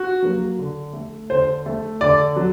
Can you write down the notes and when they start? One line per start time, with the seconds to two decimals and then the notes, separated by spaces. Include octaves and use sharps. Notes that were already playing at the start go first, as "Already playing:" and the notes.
Already playing: F#4
0.22 F#3 A#3
0.59 D3
0.93 A3
1.30 D3 C5
1.66 A3
2.01 D3 D5
2.36 F#3